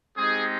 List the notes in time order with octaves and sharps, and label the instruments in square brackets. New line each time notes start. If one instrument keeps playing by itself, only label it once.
[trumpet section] G#3 C4 D#4 G4 G#4